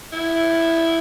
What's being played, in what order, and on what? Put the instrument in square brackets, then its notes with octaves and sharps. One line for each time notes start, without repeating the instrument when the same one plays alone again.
[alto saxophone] E4